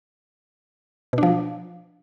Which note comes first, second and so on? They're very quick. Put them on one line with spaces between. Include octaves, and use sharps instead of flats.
B2 D4 F3